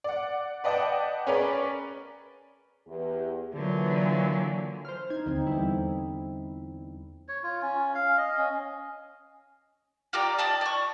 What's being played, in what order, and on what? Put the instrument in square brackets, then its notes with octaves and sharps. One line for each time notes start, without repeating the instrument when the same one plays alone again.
[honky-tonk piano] D5 F#5
B4 D5 D#5 F#5 G5 A5
C#4 G#4 A#4 B4 C#5 D5
[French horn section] E2 G4
[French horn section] A#2 E3 [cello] D3 F#3
[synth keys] C5 F6
[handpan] D#4 [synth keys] G#6
[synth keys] D#2 [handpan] D3 C4 D#4
[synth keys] E2 G3 E4
[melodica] C#5
F4
C#4
F5
D#5
C#4
[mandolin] F4 G4 D5 A#5
D5 D#5 A5
D5 C#6